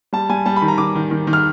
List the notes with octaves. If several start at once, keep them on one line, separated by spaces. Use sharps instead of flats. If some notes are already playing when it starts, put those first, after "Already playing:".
G3 A5
G3 G#5
G3 A5
B5
D#3
A#5
D#3 D6
D#3
D#3
D#3
F6